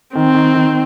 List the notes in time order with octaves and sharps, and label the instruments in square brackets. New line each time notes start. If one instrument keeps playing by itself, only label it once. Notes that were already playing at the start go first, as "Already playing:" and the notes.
[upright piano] D#3 [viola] C4
[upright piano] D#3
D#3